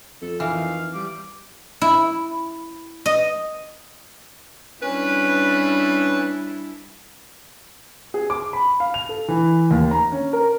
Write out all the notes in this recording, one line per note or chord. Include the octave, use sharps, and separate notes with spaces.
F2 A4
D#3 E3 F5
G3 D6
E4
D#5
G3 C#4 D4 E4 B4
G#4
D6
B5
F5
F7
A4
E3
D#2
A#5
C#4
A#4